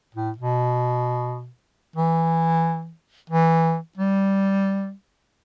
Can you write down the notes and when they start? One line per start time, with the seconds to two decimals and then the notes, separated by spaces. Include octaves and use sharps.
0.15 A2
0.38 B2
1.96 E3
3.30 E3
3.97 G3